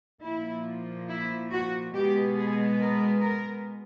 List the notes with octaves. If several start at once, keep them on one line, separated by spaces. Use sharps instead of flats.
A#2 F3 A#3 E4
E4
F#4
B2 G#3 B3 G4
G#4
A#4
A#4